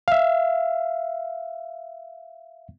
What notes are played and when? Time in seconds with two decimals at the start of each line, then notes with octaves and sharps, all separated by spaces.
0.08 E5 F5